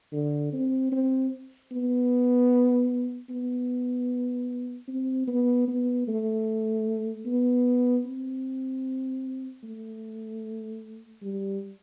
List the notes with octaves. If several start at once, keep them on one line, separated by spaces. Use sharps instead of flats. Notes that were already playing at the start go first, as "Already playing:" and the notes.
D3
C4
C4
B3
B3
C4
B3
B3
A3
B3
C4
A3
G3